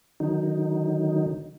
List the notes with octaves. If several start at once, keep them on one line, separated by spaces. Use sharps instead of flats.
D3 D#3 F#3 D#4